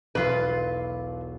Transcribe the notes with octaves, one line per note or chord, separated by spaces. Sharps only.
E1 B1 F4 B4 B6